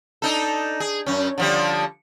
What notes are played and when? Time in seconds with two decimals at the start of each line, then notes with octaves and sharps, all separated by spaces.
0.22 D4 D#4 A4
0.80 G#4
1.06 F#2 C#4
1.38 D3 F3 G3